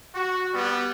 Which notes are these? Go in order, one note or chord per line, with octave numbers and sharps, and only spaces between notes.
F#4
G3 B3